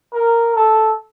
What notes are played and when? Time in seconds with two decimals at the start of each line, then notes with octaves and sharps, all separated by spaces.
0.14 A#4
0.56 A4